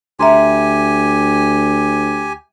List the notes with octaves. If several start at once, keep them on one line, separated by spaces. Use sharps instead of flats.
D2 G4 E5 G#5 A#5 C6